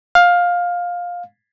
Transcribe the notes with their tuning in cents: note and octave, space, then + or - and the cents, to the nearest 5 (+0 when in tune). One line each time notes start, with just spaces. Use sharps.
F5 +15